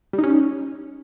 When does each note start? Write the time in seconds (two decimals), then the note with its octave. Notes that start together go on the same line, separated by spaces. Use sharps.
0.13 G3
0.18 D#4
0.24 C#4